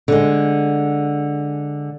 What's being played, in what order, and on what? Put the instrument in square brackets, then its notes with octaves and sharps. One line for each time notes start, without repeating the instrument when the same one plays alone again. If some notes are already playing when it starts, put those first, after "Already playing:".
[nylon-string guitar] D3 G#3